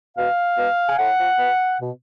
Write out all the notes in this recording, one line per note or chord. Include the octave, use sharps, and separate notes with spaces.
B2 F5
B2
G#5
A2 F#5
F3
B2
B2